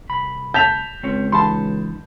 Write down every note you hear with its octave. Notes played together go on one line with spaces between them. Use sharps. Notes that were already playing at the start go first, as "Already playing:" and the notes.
C2 B5
A5 G6 B6 F7
C#2 C4 C#5
E3 D#4 A5 B5 C6